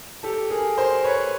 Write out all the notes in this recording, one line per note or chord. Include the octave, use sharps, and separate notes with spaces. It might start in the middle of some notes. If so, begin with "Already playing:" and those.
G4 A4
G#4 A#4
A#4 C5
B4 C#5